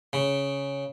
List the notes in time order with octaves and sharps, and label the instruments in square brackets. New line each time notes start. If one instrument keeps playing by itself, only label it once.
[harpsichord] C#3